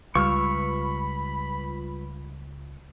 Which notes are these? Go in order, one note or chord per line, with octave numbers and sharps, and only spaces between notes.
C#2 G3 F4 B4 B5 C#6 E6 F6